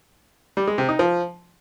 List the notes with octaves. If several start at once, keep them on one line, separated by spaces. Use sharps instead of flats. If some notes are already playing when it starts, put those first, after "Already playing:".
G3
G#3
C3
D#4
F3